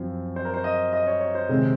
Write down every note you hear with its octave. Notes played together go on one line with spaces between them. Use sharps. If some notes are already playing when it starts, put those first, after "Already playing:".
Already playing: F#2 F3 C4
C5
A#4
C5
D#5
D#5
C#5
C#5
C5
C3 D#3 G#3 C4